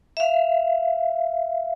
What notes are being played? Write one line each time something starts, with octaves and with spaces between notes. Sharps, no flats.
E5 F5